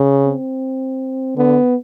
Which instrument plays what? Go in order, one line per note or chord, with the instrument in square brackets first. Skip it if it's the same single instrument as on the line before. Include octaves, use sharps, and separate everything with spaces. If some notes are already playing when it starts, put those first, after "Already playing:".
Already playing: [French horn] C#3
[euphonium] C4
[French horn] D3 [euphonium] B3